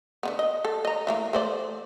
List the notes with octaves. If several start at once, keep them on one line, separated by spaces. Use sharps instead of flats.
D3 D#3 B3
D#5
A4
D#5 A#5
E3 A3 A#3
A3 C5 D5